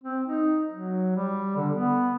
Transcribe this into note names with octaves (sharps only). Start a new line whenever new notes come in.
C4
D#4
F#3
G3
D3
B3